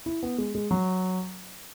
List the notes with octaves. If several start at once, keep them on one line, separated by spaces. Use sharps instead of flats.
E4
B3
G#3
G#3
F#3